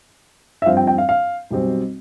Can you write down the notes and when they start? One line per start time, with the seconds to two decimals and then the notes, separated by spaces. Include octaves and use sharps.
0.62 E5
0.66 G2 F3 C4 F5
0.77 G5
0.87 G5
0.98 F5
1.09 F5
1.50 B1 B2 G3 C4